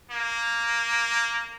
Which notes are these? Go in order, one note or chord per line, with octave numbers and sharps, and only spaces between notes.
A#3